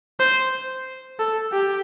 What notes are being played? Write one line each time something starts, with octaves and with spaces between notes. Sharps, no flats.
C5
A4
G4